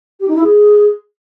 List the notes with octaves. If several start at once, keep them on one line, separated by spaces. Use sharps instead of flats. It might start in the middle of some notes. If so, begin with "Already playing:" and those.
G4
D#4
E4
G#4